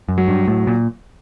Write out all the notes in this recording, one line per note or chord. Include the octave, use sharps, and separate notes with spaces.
F#2
F#3
G2
A2 F#3
A#2